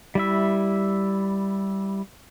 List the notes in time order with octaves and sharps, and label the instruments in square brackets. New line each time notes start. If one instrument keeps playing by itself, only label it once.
[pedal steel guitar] G3 E4 E5